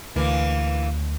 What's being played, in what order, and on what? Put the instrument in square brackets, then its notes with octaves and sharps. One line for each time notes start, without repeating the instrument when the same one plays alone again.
[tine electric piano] D2 [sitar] E3 A#3